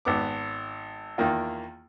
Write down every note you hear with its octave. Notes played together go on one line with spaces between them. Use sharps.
G#1 B3 D6
E2 D#3 A#3 F4